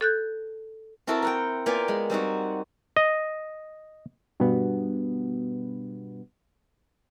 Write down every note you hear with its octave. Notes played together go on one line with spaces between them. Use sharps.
A4 F#6 G6
C4 E4 F#4 A4 A#4
A#4 F#5 G5
A#3 B3 F4 D5 G5 G#5
G#3
G3 C4 D#4 F#4
D#5
G2 B2 B3